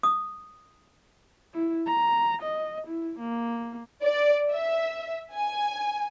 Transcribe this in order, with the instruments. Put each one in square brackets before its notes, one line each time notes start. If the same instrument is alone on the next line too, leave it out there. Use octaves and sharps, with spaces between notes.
[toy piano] D#6
[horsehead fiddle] E4
A#5
D#5
E4
A#3
[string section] D5
E5
G#5